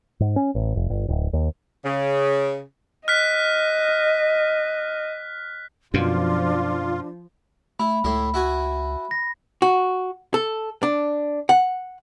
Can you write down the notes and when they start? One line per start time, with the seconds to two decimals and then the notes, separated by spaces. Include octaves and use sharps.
0.20 G#2
0.36 C#4
0.55 A1
0.76 F1
0.90 G1
1.08 D1
1.33 D#2
1.84 C#3
3.08 D#5 F6 F#6 B6
5.94 F#2 B2 F3 D4 F4
7.80 A3 E4 B5
8.04 C#2 A2 E4 C6
8.34 E4 F#4 G#5
9.11 A#6
9.62 F#4
10.34 A4
10.83 D4
11.49 F#5